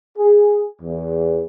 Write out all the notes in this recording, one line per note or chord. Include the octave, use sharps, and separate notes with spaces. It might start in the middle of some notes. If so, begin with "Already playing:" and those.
G#4
E2